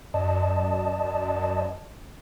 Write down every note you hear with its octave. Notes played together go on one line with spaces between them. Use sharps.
F#2 D5 D#5 A5